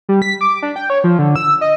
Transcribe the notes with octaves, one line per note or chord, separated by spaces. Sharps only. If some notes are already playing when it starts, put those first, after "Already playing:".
G3
B6
D6
D4
G5
C#5
F3
D3
E6
D#5